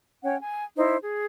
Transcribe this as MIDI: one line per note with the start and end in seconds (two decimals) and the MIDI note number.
0.23 0.36 61
0.23 0.36 73
0.23 0.36 78
0.23 0.36 79
0.41 0.64 80
0.76 0.96 63
0.76 0.96 64
0.76 0.96 72
1.01 1.25 68